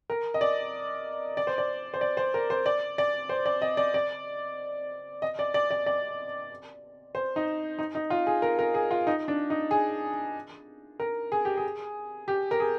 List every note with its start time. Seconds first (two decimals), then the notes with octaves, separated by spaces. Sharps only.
0.10 A#4
0.34 D#5
0.41 D5
1.37 D5
1.47 C5
1.58 D5
1.94 C5
2.01 D5
2.17 C5
2.34 A#4
2.50 C5
2.66 D5
2.98 D5
3.29 C5
3.46 D5
3.62 D#5
3.77 D5
3.94 D5
5.22 D#5
5.39 D5
5.54 D5
5.71 D5
5.86 D5
7.15 C5
7.36 D#4
7.79 D#4
7.95 D#4
8.10 F4
8.27 G#4
8.42 A#4
8.59 A#4
8.74 G#4
8.91 F4
9.07 D#4
9.28 D4
9.50 D#4
9.71 G#4
11.00 A#4
11.32 G#4
11.45 G4
11.57 G#4
12.28 G4
12.51 A#4
12.60 G#4